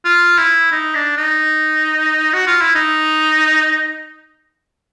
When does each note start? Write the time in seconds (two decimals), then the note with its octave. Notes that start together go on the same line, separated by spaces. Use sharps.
0.05 F4
0.38 E4
0.72 D#4
0.95 D4
1.17 D#4
2.34 F#4
2.47 F4
2.61 E4
2.75 D#4